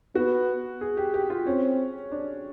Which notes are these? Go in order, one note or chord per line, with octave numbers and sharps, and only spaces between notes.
B3 F#4
G#4
G4
G4
F4
C4 C#4
D4